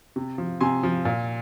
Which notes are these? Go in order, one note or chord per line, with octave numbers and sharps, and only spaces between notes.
C3
F3
C3 G#5 C6
F3
A#2